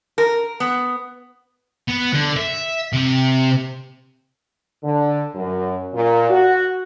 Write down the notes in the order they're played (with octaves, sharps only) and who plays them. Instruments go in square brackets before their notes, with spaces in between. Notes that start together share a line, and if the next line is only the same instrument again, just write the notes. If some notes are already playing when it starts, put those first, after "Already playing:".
[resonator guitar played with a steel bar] A#4
B3
[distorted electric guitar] B3
D3
E5
C3
[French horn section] D3
F#2
A#2
F#4